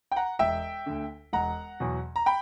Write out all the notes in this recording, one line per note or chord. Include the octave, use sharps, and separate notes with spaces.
G5
F#5 A#5
E1 E5 G5
D2 D3
E1 F#5 A#5
E2 B2 F#3
A#5
G5 B5